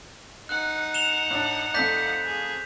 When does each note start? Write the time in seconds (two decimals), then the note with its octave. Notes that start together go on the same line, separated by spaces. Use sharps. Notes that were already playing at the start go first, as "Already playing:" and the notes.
0.49 D#4 F#5 F#6
0.94 E7 F7 G7
1.31 A2 D4
1.74 F2 A3 D5 G6 B6
2.26 G#4